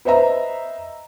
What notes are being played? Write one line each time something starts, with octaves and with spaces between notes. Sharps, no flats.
B4 C5 D#5 E5 A#5